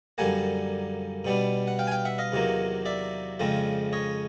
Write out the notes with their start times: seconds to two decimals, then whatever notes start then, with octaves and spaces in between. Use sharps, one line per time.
0.18 F#2 D3 G3 A#3 F#5 G#5
1.25 B2 G3 B3 D4
1.67 F#5
1.79 F5 G5
1.87 G#5
1.91 F5 G5
2.05 E5 F#5
2.18 D#5 F5
2.32 E2 C3 D#3 F#3 A#3
2.85 D5 E5
3.40 F2 C#3 F3 G#3 C4
3.93 C#5 D#5